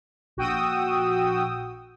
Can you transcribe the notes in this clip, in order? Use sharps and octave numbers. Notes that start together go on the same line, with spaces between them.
A#1 F#4 G5 D#6 E6